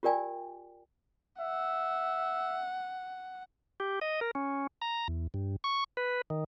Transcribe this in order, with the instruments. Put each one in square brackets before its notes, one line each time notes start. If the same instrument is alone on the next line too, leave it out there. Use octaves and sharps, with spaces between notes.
[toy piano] F4 G4 A#4 D5 G5 G#5
[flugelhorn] E5 [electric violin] F#5
[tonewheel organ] G4
D#5
A#4
C#4
A#5
E2
G2
C#6
B4
D#3